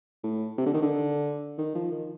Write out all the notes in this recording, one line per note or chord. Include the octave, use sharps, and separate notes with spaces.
A2
C3
D3
D#3
D3
D#3
F3
D#3